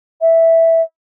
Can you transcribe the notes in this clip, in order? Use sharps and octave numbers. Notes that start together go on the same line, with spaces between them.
E5